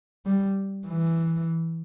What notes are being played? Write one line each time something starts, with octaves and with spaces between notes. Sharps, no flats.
G3
E3